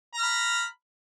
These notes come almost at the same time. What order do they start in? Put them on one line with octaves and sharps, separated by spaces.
A#5 F6 B5